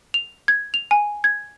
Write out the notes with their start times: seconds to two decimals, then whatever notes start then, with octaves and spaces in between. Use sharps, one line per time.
0.14 F7
0.48 G#6
0.74 F7
0.91 G#5
1.24 G#6